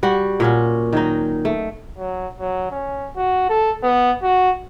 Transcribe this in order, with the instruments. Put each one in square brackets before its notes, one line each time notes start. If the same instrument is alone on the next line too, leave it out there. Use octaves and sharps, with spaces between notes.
[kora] G3 F#4 F#5
A#2 C#4 F#4
D#3 F#3 D#4
A3
[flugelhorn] F#3
F#3
C#4
F#4
A4
B3
F#4